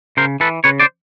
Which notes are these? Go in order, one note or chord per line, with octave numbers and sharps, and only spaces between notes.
C#3 A#4 C5
E3 A4 B4
C#3 B4 C#5
C5 D5